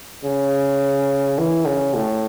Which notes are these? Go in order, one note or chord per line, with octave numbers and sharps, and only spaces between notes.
C#3
E3
C#3
A2